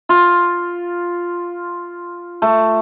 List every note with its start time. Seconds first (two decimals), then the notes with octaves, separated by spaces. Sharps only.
0.09 F4
2.42 A3